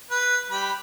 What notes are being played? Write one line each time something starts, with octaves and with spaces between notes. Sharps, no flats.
B4
G3 B5